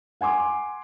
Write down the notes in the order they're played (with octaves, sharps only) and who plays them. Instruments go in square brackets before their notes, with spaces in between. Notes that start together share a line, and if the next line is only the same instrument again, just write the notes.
[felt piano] F#5 G#5 C6 D6